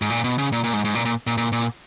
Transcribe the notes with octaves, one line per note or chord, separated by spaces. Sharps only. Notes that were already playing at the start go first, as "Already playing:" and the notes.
G#2
A#2
B2
C#3
A#2
A#2
G#2
G#2
A#2
A#2
A#2
A#2
A#2